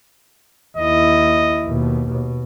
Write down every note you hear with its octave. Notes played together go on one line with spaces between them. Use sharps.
D#2 E4 D#5
D#2 B2
B2